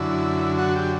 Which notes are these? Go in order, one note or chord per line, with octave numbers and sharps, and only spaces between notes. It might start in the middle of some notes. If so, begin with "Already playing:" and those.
Already playing: F#2 D3 E4
F#4
G4